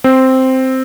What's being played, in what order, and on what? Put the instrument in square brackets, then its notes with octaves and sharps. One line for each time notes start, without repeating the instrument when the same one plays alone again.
[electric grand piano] C4